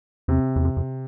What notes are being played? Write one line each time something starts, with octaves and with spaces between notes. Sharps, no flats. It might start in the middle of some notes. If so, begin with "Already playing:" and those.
E2 C3
E2
F2
F2